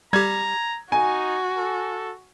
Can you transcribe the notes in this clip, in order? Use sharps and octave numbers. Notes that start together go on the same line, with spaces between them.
G3 G4 A#5 G#6
D#4 F#4 G#5
A4